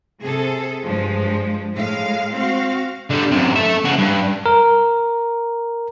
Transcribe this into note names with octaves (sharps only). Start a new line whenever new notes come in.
C3 G#4 A4
G2 F3 G#3
A2 G#3 F5
C4 F#4 F5
D3 G3
F#2 C3
A4 E5
C#3 F#4
G2
A#4